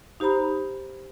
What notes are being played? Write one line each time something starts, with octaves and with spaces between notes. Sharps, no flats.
D#4 G4 C5 A#5 B5